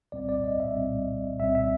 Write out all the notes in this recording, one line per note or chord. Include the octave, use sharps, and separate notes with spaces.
C2 A#2 G3 C4 D5
D5
D#5
E5
C2 A#2 G3 C4
C2 A#2 G3 C4 E5
E5